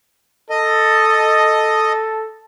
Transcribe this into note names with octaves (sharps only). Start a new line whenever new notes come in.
A4 D#5